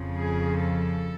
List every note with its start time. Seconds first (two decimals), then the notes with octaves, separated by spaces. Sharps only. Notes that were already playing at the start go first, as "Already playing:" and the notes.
Already playing: F2 C#3 F3
0.17 G#4
0.60 A4